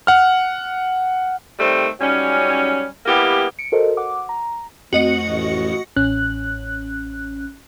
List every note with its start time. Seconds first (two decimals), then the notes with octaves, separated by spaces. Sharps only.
0.07 F#5 F6
1.59 D#3 G3 A3 C4
1.99 G#2 F#3 G3 C#4
3.06 G3 A#3 B3 E4 G4
3.59 C#7 D7
3.72 F#4 A4 A#4 C5 D#5
3.97 F#5 D6
4.29 A#5
4.93 F2 A3 C4 F#4 D#5 C#7
5.28 A1
5.96 A1 C#4 F#6